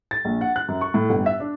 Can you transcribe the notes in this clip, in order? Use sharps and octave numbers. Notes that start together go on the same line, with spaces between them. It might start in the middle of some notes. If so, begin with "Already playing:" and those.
A6
A#1
F#5
F#6
F#2
C#6
A2
G1
E5
D4